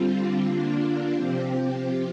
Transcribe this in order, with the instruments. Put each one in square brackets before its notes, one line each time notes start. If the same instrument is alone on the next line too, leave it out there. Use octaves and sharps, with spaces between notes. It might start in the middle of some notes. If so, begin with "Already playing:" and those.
Already playing: [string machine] D3 G3 C4 F4
D3 A#3 D4 F4
C3 F3 C4 G4